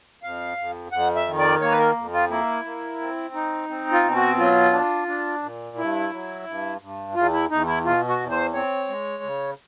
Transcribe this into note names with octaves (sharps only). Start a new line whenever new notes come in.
F2 F5
F2
F2 F#5
E5
D#3
D5
A#3 C#5
B4
A#4
F2
F4
A#3 E4
A#3
C4
D#4
C4
F4
B2
F#4
F#3 F4
D4
D4
A#2
G2 E4
F#3
G2
G2
E2 F4
E4
E2 D#4
E4
B2 F4
F#4
E2
C5
C4 C#5
G#3
C#3